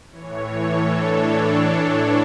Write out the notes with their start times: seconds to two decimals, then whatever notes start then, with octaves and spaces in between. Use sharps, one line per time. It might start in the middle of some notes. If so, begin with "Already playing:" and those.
0.11 A2 E3 C#5
0.55 A4
0.98 D4